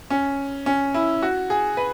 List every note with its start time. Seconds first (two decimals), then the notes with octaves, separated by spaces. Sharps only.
0.10 C#4
0.66 C#4
0.94 E4
1.22 F#4
1.50 G#4
1.77 B4